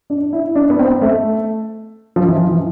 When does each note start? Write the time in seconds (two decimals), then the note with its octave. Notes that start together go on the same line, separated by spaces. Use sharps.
0.10 D4
0.33 E4
0.55 D4
0.70 B3
0.79 C4
1.02 A3
2.16 F3
2.28 E3
2.40 F3
2.51 E3